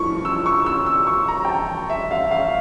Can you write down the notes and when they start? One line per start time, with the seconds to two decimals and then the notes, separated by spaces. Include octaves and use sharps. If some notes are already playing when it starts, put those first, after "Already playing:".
Already playing: G2 F3 A3 E4 C#6
0.25 E6
0.46 C#6
0.66 E6
0.86 E6
1.07 C#6
1.28 A#5
1.45 G5
1.48 A5
1.90 E5
2.11 F5
2.31 F5